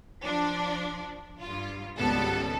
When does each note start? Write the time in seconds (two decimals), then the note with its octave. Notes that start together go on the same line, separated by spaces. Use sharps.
0.22 F3 D4
1.42 G2 F4
1.96 G#1 C#2 G3 B3 A4 A5